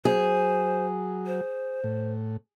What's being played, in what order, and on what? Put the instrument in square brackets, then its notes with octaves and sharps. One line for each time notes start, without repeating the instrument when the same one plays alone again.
[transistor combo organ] F#3 [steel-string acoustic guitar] G#4 [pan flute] C5
[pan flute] C5
[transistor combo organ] A2